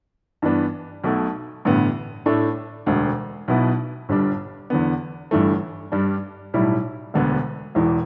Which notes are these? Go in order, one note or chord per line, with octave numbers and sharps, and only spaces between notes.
G2 E3 B3 D4
B1 B2 A3
A1 G2 D3 B3
A2 A3 D4
E1 D2 D3
B1 B2 B3 E4
G1 G2 G3 D4
E2 D3 B3
G1 G2 E3 A3
G2 G3 D4
B1 A2 G3 E4
E1 D2 D3 B3
E1 E2 E3